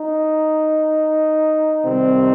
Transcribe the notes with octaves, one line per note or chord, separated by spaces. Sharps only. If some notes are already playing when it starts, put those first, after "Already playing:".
Already playing: D#4
C3 D#3 G3 C4